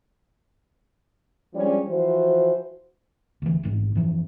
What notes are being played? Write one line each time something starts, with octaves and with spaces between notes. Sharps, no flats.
F3 G3 G#3 C#4 D4
E3 F3 F#4 C5
D2 E3
A1 G#2
F#2 E3 F3